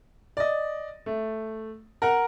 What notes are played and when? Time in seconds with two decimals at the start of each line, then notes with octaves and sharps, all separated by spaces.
0.37 D5 D#5
1.06 A3
2.02 A#4 F#5 A#5